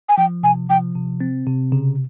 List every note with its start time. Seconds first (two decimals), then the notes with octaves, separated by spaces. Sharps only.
0.09 G#5
0.17 F3 G5
0.43 C3 G#5
0.70 F3 G5
0.95 C3
1.21 C4
1.47 C3
1.72 C#3